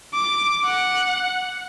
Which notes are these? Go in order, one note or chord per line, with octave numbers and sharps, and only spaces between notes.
D6
F#5